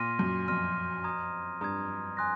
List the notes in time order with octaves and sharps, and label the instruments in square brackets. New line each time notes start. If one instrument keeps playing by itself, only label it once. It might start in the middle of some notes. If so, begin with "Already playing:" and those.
Already playing: [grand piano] A#2 [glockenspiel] C6 F6 A#6 D#7
[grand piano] F#2
[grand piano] F2 [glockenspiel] C6 F6 A#6 D#7
[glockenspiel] A#5 D#6 G#6
[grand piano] G2 [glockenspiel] A#5 D#6 G#6
[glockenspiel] G#5 C6 D#6 F#6 A#6